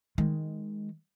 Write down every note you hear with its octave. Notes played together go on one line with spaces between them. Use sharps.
D#3 G#3